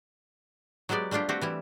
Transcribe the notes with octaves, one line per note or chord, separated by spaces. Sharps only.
F#3 G#3 B3 G4 D5
G3 A3 D4 F4 G4
A3 C4 F#4 G4
E3 G3 E4